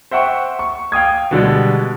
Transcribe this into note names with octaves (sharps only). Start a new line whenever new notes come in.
C5 E5 F#5 G5 C#6
C#6
F5 G5 D#6 G#6
B2 D3 G3 G#3